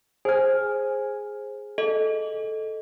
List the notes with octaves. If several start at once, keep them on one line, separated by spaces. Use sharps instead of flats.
G#4 C5 G#5 F6
A4 D#5